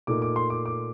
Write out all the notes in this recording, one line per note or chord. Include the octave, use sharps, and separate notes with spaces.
A#2 A3 D#4 D6
D6
C6
D6
D6